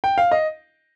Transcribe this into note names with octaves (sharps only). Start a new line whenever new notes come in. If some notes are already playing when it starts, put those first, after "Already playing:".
G5
F5
D#5